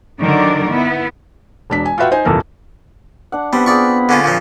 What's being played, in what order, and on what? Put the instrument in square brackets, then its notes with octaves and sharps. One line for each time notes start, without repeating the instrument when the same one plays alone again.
[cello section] D3 D#3 F#3 D4 A#4 D5
B3 E4
[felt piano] E1 D4 B6
G#5
F4 F#4 B4 E5 F#5 G5
D#4 C5 G#5
D#1 F2 C3 E3 A4 A#4
[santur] D4 F#5
[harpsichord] G3 [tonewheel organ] B3 [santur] C4 F#5
[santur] F4 G#4 G5 [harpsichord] D5 C#6
[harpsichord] D3 C#4 F4 [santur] E5
[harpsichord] A#2 C#3 F3